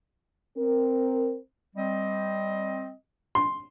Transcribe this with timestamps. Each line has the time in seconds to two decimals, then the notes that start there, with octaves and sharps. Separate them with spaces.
0.58 C4 A#4
1.76 G3 C4 D#5
3.35 C6